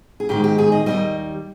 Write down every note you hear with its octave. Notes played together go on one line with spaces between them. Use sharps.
G#4
G#2 D#3 G#3 G4
G4
G#4
D#5
D#2 C#3 G3 D#5